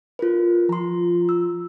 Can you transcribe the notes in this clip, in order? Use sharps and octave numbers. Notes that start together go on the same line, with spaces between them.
F4 A#4 B4
F3 A#5 C6
E6